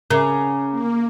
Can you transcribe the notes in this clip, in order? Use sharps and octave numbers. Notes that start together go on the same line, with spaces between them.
C#3 A#4 E5 A#5 D6
A#3